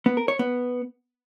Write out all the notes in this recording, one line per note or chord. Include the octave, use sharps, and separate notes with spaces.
B3
A#4
C#5
B3